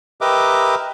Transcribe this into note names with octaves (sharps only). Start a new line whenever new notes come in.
G4 A#4 B4 D#5 E5 D6